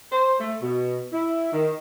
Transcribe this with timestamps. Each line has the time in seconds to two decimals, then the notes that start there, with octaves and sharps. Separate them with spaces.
0.12 C5
0.40 A3
0.62 B2
1.13 E4
1.53 D#3